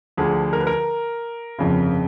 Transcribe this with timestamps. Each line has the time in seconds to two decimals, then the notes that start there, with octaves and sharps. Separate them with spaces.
0.17 D2 D3 F3 G#4
0.53 A#4
0.60 B4
0.67 A#4
1.59 G1 F2 C#3